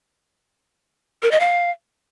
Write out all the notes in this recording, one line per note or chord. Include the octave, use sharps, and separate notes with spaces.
A#4
D#5
F5